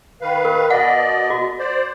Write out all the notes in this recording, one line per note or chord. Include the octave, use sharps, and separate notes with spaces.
D#3 B4 F5
A#4
B2 D5 D#5 F#5
F#4
C5 D5